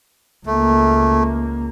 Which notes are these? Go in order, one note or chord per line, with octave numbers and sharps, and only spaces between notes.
C#2 A3 A#3